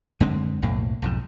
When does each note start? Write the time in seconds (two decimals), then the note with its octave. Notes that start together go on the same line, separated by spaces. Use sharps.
0.20 F#2 D3 G#3 C4
0.62 B1 F2 A2 A#3
1.02 B1 F2 G#2